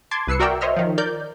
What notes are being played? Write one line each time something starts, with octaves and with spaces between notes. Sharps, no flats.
A5 C6 D6 G#6
C2 B4 E6 C7 C#7
F#4 A#4 D5 E5 G5 E6
C5 C#5 D#5 E5 F6
D#3 F3
A#4 D5 G6